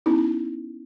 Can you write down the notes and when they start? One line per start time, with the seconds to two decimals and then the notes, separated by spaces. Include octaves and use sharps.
0.06 B3 C#4 D#4 E4